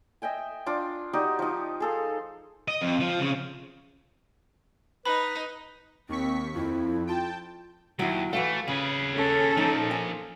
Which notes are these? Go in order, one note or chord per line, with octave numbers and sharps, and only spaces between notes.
D#5 E5 G5 G#5
D4 F4 D5
D#4 F#4 G4 D5
F3 D#4
G#4 A4 F5
D#5
F2
F3
C#3
D#4 B4 B5
D#2 C4 C#6 B6
F2 E4
F4 G5 A5
D#2 F#3 E4
E3 A3 F#4 F5
C#3 G#4 B4
C#4 A4
F3 A#3 D#4
G#5